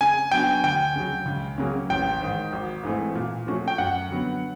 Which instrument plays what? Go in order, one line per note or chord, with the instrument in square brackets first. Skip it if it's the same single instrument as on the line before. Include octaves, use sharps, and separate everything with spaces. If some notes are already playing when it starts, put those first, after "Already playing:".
[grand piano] C#3 [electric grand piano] G#5
[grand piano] F#3 B3 D4 F#4 [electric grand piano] G5
[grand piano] D2 [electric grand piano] G5
[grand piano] C#3 F#3
C#2
C#3 F#3 A#3 C#4
[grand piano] A1 [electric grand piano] G5
[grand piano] G#2 D#3
G#1
G#2 E3 A3 C4
A#2
F3 A3 C#4 F#4
[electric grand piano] G5
[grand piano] F#2 [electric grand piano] F#5
[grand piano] D3 F#3 B3